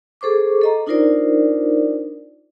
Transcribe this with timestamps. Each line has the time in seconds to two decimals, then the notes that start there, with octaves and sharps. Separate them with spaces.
0.21 G#4 A4 C5 C#6 D6
0.61 A4 D#5 A#5
0.87 D4 D#4 F4 A#4 C5 D5